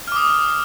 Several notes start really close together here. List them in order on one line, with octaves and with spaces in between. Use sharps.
F6 D6 D#6